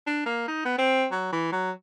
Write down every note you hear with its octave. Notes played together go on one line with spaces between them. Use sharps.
D4
A#3
D#4
B3
C4
F#3
E3
F#3